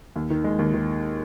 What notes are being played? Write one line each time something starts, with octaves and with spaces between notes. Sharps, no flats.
D#2
D#3
G#3
D#2
D#3